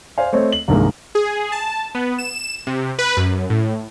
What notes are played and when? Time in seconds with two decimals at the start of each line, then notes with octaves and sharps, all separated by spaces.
0.18 C5 D5 F5 G#5
0.33 A3 C4 C#5 D#5
0.52 F#7
0.68 C2 G2 D#3 G#3 A#3
1.15 G#4
1.52 A5
1.95 B3
2.18 E7
2.67 C3
2.99 B4
3.17 F#2
3.50 A2